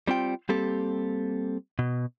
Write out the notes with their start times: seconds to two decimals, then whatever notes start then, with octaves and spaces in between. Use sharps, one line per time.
0.08 G3 C4 F4 G5
0.49 G3 A#3 C4 G4 A4
1.79 B2